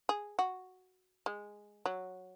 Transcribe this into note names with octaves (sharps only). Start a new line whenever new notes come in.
G#4
F#4
G#3
F#3